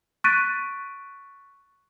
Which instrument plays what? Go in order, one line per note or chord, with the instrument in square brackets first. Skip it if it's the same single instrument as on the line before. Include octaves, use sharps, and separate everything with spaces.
[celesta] C#6 F#6 A6 B6 D7 D#7